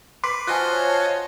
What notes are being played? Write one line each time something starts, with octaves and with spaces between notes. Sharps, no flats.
B4 C6 D6 B6
F4 F#4 C5 D#5 F5 G#5 A5 F#6
C#5